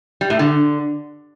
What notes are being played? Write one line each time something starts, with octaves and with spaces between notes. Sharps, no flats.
G3
A2
D3